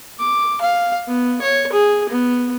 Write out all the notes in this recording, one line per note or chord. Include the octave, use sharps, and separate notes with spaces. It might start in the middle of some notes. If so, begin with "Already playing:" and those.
D6
F5
B3
C#5
G#4
B3